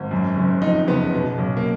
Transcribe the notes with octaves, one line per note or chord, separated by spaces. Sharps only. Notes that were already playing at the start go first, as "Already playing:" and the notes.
Already playing: G#1
F#2
F#1
F2 D#4
F#1 B3
B2
B1
A#3